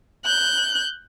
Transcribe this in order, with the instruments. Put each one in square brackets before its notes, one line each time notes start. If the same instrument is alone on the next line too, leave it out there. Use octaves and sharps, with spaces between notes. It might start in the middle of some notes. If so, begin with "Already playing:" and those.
[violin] F#6 G6